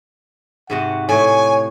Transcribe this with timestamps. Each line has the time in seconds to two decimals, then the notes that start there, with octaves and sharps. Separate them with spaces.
0.70 G#2 C3 F#4 F#5
1.09 A2 C#5 G#5 A5